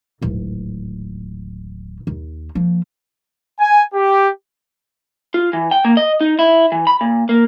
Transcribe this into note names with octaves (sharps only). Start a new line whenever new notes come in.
D1 G#1
D#2
F3 A#3
G#5
G4
F4
E3
G5
A#3
D#5
D#4
E4
E3
B5
A#2
A#3